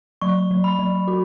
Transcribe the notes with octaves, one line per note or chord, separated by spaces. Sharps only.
F#3 C#6
F#3
B5
F#3
F#4